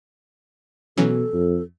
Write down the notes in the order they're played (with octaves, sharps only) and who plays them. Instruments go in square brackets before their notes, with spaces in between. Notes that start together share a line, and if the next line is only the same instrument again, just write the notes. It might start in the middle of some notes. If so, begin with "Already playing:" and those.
[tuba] B2 [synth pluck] E3 F#3 C#4 [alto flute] A4
[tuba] F2